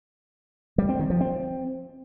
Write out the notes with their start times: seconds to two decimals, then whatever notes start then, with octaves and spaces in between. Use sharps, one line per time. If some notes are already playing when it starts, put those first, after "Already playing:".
0.78 G3
0.89 C4
0.99 D#3
1.10 F3
1.21 C4